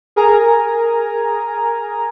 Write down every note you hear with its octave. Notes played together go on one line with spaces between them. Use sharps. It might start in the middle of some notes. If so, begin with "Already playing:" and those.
G#4 A#4 G#5 A#5